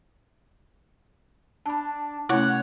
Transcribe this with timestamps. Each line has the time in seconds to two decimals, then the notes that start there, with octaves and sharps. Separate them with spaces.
1.66 D4 A5 B5
2.29 C3 A3 C#4 E4 C#5 F#5 C#6 D6